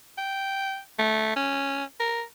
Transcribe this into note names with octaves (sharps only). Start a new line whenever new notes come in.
G5
A3
C#4
A#4